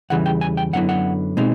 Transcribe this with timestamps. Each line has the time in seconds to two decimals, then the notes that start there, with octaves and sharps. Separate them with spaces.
0.10 E2 C#3 E3 G3 F#5
0.26 G5
0.41 G#5
0.57 G5
0.73 F#2 D3 F#3 B3 E4 F#5
0.89 F#5
1.37 B2 G#3 C4 D#4